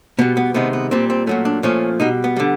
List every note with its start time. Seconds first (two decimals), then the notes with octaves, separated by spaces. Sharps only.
0.19 B2 G3 B3
0.37 B3
0.55 C3 D#3 G#3 B3
0.73 B3
0.91 A#2 G3 C4
1.10 C4
1.27 A#2 F#3 A3 C#4
1.45 D4
1.63 A#2 F3 A3 C#4
2.00 B2 G3 D#4
2.24 B3
2.36 D3 G3